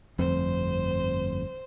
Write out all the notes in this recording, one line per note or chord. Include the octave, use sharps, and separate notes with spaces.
G1 F2 A3 C4 C5